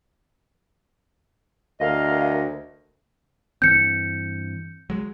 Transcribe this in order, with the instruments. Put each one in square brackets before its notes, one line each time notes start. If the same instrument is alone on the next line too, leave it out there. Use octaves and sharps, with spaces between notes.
[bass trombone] D2 [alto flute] A#4 [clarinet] D#5 [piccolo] F5
[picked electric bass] G2 E3 C4 [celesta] G6 C#7
[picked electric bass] F#3 G#3